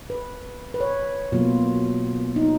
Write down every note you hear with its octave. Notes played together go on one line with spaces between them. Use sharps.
B4
B4
C#5
B2 F#3 A#3 F4
D#4